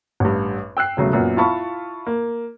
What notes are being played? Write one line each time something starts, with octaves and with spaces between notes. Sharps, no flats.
A1 G2
G5 E6 F#6 C7
E1 C#3 F#3 A3
F#2 A#2 B3
E4 F4 F5 A5 B5 C#6
A#3